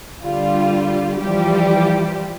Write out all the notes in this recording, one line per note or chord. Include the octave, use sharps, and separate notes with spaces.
D3 G3 F4
E3 F3 G3 G4